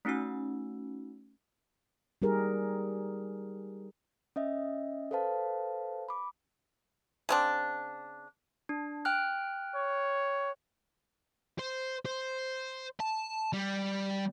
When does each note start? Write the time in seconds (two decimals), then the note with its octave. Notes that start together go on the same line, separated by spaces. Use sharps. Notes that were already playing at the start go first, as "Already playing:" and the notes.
0.05 A3 C#4 D#4 F#4 E6
2.22 G3 D#4 G4 G#4 A#4
4.36 C#4 D#5 E5
5.11 A4 B4 C5 F5 A5
6.09 B5 D6
7.29 C#3 C4 D4
8.69 D4
9.05 G5 F6 F#6
9.75 C#5
11.59 C5
12.06 C5
13.00 A5
13.53 G3